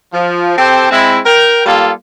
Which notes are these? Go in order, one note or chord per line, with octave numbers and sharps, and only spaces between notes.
F3
C4 G4 A4 C5
G#3 C4 E4
A#4 G5
G3 A#3 F4 A4